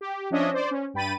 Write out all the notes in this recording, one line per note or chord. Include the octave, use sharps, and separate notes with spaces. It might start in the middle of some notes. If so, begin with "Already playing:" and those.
G4
F3 C#4 D4 C#5 D#5 E5
C5 D5
C#4
G2 G5 B5 A6 D#7